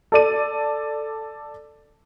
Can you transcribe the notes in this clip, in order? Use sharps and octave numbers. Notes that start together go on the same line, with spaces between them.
A4 D5 D#7